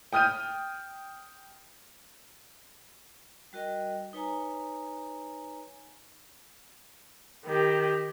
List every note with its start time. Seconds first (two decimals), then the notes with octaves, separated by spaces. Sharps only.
0.13 G5 D#6 F6 G6 D#7
3.53 G3 F#4 A#4 D#5 G5
4.13 D#4 B4 C#5 G#5 A#5
7.46 D#3 G4